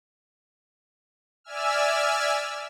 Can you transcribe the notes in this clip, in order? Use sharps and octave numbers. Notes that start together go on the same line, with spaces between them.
D5 E5 G#5 E6 F6